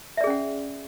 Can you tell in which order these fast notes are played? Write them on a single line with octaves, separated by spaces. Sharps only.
E5 D5 G#4 C#4 F#5